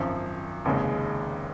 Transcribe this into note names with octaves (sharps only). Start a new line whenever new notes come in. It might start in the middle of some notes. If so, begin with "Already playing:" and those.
Already playing: G#1 F#2 F3
F1 D#2 C#3 G#3